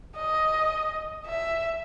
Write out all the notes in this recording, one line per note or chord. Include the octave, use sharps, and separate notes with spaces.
D#5
E5